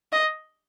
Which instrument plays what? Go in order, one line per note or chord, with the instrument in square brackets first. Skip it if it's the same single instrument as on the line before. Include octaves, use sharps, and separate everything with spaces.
[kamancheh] D#5